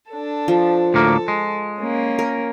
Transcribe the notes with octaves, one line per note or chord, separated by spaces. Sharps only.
D4 A4
F3
D2 A2 A#3 A4
G#3
A#3 C#4
A#4